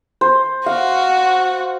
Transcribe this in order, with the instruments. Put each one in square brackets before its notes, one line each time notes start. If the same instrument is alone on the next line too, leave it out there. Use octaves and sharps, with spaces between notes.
[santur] C5
[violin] F#4 [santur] F5